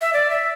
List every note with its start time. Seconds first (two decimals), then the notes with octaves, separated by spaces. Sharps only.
0.01 E5
0.13 D5
0.30 E5